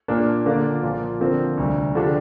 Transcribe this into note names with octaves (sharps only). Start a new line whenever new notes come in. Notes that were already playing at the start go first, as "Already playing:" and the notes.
A#2 A#3 D4
D3 A#3 D4 F4 D5
A#2 F3 A#3 F4
D3 F3 C4 A#4
D2 C3 G3
D3 F3 D4 G4